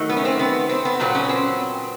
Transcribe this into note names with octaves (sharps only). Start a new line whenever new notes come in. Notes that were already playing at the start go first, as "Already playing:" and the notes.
Already playing: D#3 F#3 A3
B3
C#4
C4
B3
C4
B3
A#2 F#3 B3 C4
C#4
C4